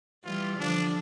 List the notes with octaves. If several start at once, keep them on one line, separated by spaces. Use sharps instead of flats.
E3 G3 F4
D3 F3 D4